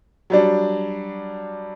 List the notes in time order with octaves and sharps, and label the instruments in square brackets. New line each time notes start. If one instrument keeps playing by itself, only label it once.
[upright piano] F#3 G3 D4